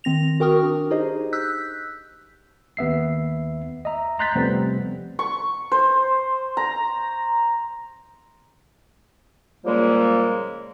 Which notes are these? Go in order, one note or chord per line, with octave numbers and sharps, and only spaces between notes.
D#3 C4 A#6 F7
F#4 A#4 G5 C#6 D#6 F6
D4
D#4 G4 G#4 C5 D#5
E6 F#6 G6 B6
D#2 B3 E5 C7
D#5 E5 A#5
A#5 C6 F#6 G6 A6 B6
C3 F3 G3 A3 B3 C4
C#6
C5
A#5
A#2 C#3 F3 G3 G#3 A#3